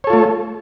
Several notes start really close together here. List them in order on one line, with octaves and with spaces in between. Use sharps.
C#5 A4 F4 A3